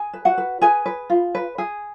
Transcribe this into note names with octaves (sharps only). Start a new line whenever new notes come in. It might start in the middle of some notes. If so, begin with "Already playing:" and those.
Already playing: G#4 G#5
B4
F#4 F#5
B4
G#4 B4 G#5
B4
F4
B4
G#4